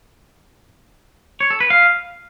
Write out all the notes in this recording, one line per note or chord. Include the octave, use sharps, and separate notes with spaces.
C#5
A4
B4
F5